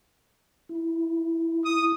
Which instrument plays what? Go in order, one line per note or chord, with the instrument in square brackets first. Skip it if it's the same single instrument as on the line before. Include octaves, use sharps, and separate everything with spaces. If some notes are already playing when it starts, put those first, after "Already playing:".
[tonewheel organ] E4
[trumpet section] D#6